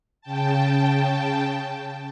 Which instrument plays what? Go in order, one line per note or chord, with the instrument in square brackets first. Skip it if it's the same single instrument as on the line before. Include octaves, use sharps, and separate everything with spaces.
[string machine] C#3 G5 A5